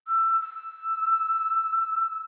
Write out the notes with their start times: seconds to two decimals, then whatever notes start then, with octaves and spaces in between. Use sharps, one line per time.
0.07 E6
0.42 E6